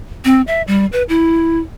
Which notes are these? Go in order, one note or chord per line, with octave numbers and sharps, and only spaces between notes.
C4
E5
G3
B4
E4